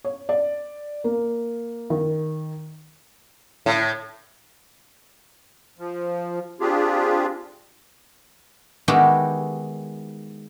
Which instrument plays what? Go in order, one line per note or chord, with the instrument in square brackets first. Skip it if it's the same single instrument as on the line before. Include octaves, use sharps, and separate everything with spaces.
[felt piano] C#5
D5
A#3
D#3
[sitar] A2
[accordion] F3
C4 D4 F4 G4 G#4
[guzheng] D#3 G#3 B3 E4 F#4 G4